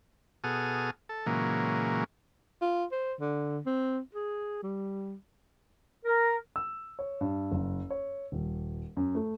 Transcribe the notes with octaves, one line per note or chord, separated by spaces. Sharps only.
B2 F#4 G#4 A4 D#6 F6
A4
A#2 C#3 E3 F#3 G#3 A#3
F4
C5
D3
C4
G#4
G3
A#4
E6
C#5
G2
F#1
C#5
D#1
F#2
A3